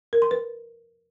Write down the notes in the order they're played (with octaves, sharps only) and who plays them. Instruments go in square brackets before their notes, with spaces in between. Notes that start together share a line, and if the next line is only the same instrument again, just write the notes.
[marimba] A#4
C6
B4